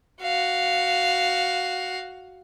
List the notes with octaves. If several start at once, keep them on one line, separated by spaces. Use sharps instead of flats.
F#4 F5